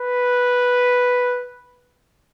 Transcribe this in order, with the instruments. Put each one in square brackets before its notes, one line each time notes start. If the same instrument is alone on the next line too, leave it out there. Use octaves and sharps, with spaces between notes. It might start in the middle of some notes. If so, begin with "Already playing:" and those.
Already playing: [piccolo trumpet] B4